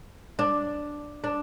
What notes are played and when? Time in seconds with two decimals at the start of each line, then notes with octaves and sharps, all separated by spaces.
0.39 D4
1.24 D4